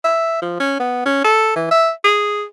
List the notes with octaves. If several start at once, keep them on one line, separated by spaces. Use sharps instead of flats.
E5
F3
C#4
B3
C#4
A4
E3
E5
G#4